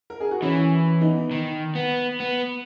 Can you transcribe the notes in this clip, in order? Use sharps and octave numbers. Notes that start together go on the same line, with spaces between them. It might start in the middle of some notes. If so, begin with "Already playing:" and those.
A#4
G#4
F#4
E3 C#4 E4
B3 D#4
D#3
B3
B3